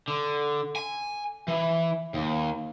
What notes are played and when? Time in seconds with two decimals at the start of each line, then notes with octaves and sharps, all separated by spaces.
0.08 D3
0.76 G#5
1.48 E3
2.14 D#2